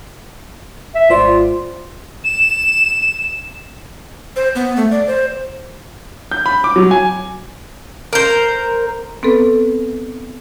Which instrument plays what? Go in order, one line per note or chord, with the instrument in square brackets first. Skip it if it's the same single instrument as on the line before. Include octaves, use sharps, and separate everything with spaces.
[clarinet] E5
[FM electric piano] G#1 C5 D5 [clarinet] F4
[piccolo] E7
[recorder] C5
B3
A3
D5
C5
[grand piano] G6
B5
D6
F#3
G#5
[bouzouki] A#4 C5
[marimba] B3 C4 A4 B4